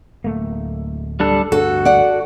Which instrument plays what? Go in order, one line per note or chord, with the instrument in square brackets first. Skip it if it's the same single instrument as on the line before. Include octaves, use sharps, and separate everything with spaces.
[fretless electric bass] D1 A3 A#3
[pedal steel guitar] G3 D4 A4
[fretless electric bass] D2 G2 [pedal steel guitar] F#4 [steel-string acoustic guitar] A4
[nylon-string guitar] D5 F#5